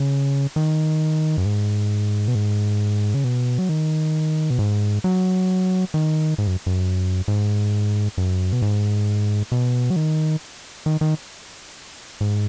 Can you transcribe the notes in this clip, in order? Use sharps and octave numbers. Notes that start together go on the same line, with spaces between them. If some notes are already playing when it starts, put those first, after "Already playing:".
Already playing: C#3
D#3
F#2
G#2
B2
G#2
C#3
B2
F#3
D#3
B2
G#2
F#3
D#3
G#2
F#2
F#2
G#2
F#2
B2
G#2
B2
F#3
D#3
D#3
D#3
G#2